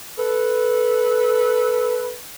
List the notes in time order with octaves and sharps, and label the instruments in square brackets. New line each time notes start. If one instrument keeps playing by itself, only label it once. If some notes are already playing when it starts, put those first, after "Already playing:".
[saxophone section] A4 B4